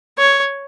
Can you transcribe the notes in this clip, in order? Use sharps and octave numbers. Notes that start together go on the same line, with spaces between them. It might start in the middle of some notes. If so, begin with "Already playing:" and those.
C#5